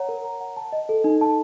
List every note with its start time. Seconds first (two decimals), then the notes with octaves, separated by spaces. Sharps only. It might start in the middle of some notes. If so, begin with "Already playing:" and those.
Already playing: C#5 F#5 A#5
0.09 A#4
0.24 A#5
0.40 F#5
0.57 A5
0.72 D#5
0.89 A4
1.04 D#4
1.21 A5